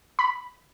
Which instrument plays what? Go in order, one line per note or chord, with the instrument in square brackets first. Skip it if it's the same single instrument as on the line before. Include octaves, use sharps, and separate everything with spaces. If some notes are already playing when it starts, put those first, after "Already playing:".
[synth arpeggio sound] B5